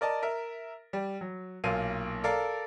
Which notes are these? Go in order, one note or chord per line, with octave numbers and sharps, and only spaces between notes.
A#4 D5 D#5 A5
A#4 E5
G3
F#3
B1 A#2 A#3 F5 D#7
A4 A#4 D5 F5